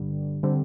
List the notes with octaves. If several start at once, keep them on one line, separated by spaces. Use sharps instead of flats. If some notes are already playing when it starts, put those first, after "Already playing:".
Already playing: G1 G2 D3 G3
D3 G3 C4